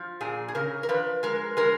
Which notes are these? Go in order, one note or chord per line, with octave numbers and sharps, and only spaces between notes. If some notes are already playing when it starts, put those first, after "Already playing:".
Already playing: F3
A#2 G#4
G#4
C#3 A#4
A#4
F3 B4
G#3 A#4
G#3 A#4